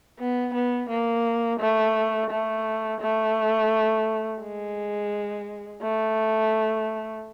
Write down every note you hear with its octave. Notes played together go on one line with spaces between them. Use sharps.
B3
B3
A#3
A3
A3
A3
G#3
A3